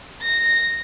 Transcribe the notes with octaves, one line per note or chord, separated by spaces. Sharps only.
A#6